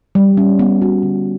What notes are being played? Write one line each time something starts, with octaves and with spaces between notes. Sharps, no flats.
G3
C#4
B3
F#4
D3